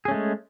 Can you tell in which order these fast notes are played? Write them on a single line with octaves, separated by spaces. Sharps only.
G#4 C#4 A3 G#3